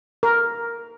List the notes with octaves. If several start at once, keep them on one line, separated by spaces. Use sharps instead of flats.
A#4